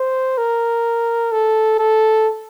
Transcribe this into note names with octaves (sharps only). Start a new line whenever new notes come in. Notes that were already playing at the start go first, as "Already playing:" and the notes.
Already playing: C5
A#4
A4
A4